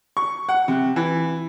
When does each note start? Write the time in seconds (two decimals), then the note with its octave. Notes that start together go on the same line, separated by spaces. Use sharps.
0.17 C#6
0.49 F#5
0.68 C3
0.96 E3